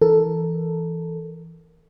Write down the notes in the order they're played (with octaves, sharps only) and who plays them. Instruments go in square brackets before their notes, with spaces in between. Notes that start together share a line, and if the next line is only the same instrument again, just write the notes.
[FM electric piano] E3 A4 A#4